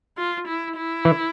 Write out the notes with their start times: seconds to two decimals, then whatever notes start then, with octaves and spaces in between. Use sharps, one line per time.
0.17 F4
0.47 E4
0.77 E4
1.05 E3